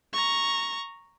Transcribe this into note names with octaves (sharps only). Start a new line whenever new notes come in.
A#5 C#6